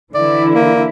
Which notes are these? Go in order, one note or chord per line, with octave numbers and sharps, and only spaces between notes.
D3 E3 E4 D5
A#3